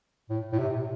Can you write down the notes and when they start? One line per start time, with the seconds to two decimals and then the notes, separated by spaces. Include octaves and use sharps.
0.30 A2
0.53 A2
0.59 C3